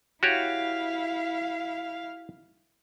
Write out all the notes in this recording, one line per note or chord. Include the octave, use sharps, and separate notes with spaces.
E4 F#4 G4 C#5 F5